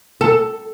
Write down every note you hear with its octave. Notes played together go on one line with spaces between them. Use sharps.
A4